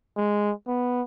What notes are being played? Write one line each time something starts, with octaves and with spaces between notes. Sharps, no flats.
G#3
B3